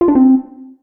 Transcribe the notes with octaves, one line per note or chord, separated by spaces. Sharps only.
F4
D4
C4